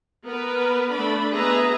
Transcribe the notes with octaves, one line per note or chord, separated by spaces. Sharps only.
B3 A#4 B4
A3 D4 B5
B3 G#4 B4 D#5 E5 A#5